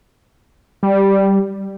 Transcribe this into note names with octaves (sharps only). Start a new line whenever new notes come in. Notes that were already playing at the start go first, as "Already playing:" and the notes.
G3